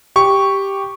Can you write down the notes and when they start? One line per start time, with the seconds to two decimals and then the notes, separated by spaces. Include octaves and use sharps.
0.16 G4 C#6